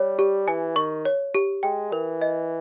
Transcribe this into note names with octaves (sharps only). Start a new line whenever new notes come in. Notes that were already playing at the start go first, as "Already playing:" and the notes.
Already playing: G3 C#5
G4
E3 G#5
D#3 C#6
C#5
G4
G#3 G5
E3 A#4
D#5